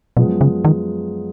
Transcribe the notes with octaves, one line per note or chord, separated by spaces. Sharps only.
F#2 B2 F3 G#3 B3
C#3
D#3